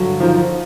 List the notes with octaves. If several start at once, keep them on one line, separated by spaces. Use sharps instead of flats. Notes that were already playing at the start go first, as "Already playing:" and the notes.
Already playing: G2 D3 F#3
D#3 F3